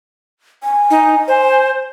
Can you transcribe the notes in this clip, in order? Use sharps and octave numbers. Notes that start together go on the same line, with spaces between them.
G#5
D#4
C5